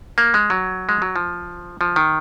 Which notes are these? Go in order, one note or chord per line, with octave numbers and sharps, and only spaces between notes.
A#3
G#3
F#3
G#3
F#3
F3
F3
D#3